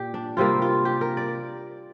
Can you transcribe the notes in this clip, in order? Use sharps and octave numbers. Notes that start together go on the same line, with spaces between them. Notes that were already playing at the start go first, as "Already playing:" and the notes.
Already playing: A#2 G4
D4
C3 G3 A#3 F4
F4
G4
A#4
D5